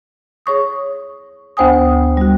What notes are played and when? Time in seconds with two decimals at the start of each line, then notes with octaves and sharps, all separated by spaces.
0.46 G#4 C#5 C#6 D#6
1.57 D2 B3 C5 G5 G#5 D#6
2.17 G3 F#4